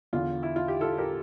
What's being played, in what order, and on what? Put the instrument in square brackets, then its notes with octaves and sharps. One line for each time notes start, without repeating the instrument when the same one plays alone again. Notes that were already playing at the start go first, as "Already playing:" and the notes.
[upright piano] E2 D3 F4
E4
F4
G4
F4 A4
G4 A#4